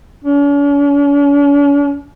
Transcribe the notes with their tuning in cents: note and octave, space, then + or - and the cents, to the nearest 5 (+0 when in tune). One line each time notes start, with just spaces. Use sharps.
C#4 +45